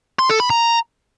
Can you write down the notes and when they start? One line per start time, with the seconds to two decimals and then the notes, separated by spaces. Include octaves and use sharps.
0.19 C6
0.29 A4
0.40 B5
0.50 A#5